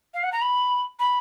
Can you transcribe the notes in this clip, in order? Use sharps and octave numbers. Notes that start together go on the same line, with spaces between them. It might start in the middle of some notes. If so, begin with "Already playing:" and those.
F5
F#5
A#5
B5
B5